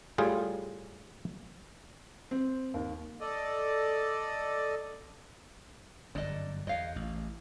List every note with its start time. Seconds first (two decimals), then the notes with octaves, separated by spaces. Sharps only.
0.18 A2 G3 F4 G#4
2.31 C4
2.74 D#2
3.21 A4 D5 D#5
6.15 G1 F#2 D4 D#5
6.67 E2 D#5 F5
6.96 A1